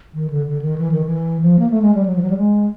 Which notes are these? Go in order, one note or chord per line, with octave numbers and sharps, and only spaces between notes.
D#3
D3
D3
D#3
E3
D#3
E3
F3
A#3
A3
G#3
G3
F#3
F3
F#3
G3
G#3